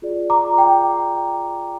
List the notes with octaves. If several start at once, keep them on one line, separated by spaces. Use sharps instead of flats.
F4 G#4 D5
A#5 D6
G5